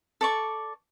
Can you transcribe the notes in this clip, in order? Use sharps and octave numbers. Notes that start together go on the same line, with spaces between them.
A4 D5 C#6